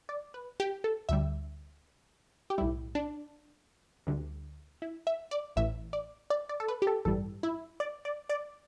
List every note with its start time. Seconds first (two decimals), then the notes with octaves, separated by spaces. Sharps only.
0.09 D5
0.34 B4
0.60 G4
0.84 A4
1.09 D2 D3 G3 E5
2.50 G4
2.58 B1 A2 G3 E4
2.95 D4
4.07 D2 D3 G3
4.82 E4
5.07 E5
5.31 D5
5.56 A1 A2 E3 E5
5.93 D5
6.30 D5
6.49 D5
6.60 A4
6.68 B4
6.82 G4
6.87 A4
7.05 A1 G2 E3 G3 A4
7.43 E4
7.80 D5
8.05 D5
8.29 D5